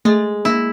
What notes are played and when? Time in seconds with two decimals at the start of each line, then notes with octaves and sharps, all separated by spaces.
0.05 G#3 A3
0.45 A#3 E4